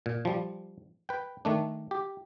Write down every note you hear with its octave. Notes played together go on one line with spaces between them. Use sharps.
A#2
F3 G3
B4 G5
D#3 A3 D4
G4